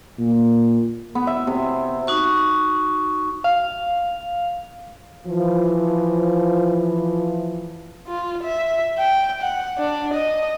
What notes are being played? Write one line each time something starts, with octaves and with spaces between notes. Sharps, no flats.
A#2
B3
E5
C3
D#4 F#4 C#6
F5
E3 F3
F4
E5
G5
F#5
D4
D#5